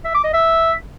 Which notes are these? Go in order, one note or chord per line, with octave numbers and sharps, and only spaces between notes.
E5
D6
D#5
E5